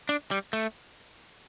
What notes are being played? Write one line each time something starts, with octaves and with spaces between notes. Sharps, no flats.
D4
G3
A3